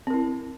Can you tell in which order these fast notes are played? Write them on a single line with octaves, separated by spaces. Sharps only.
C4 A#4 E4